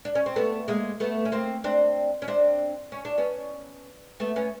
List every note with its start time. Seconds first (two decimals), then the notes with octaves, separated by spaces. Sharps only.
0.05 D4
0.15 C#4
0.26 C4
0.36 A3 B3
0.68 G#3 A#3
1.00 A3 B3
1.25 C#4
1.32 A#3 C4
1.64 C4 D4
2.22 C#4
2.28 C4 D4
2.92 C#4
3.05 D4
3.18 B3 C#4
4.20 A3 B3
4.36 B3 C#4